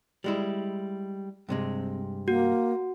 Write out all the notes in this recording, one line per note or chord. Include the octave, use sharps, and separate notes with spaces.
G3 G#3 E4
G2 C3 G#3 C4
A#3 F#4